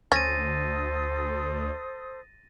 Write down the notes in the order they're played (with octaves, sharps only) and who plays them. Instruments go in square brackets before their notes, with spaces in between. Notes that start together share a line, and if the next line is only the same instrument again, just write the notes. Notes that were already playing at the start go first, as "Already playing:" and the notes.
[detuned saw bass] D2 [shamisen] C#4 [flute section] A4 C5 D#6 [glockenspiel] A6 A#6 D#7